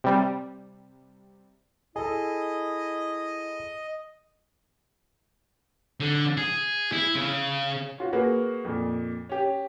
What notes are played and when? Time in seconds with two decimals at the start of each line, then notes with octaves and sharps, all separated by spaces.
0.04 C3 G3
1.96 E4 G#4 A4 D#5
6.00 D3
6.37 G#4
6.92 E4
7.15 C#3
7.98 C#4 F4 F#4
8.13 A#3 F#4 G#4 B4
8.65 F2 A#2
9.29 C#4 G4